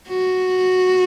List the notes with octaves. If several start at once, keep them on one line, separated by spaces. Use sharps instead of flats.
F#4